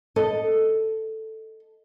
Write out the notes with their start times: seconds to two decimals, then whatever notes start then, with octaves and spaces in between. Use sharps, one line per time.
0.16 A4 D#5